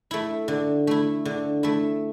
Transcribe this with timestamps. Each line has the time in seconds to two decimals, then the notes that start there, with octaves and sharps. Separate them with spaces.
0.11 A3 E4
0.48 D3
0.87 A3 E4
1.25 D3
1.63 A3 E4